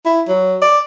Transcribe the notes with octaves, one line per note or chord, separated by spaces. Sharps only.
E4
F#3
D5